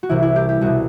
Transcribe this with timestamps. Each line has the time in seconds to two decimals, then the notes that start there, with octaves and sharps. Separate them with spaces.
0.03 F#4
0.09 C2 C3 E3 E4
0.22 E4
0.36 G4
0.49 G4
0.61 C2 B2 F#4